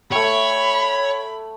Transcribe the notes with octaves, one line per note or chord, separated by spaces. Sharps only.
A3 C#5 G5 B5